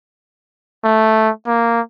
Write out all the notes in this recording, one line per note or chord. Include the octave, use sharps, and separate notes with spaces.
A3
A#3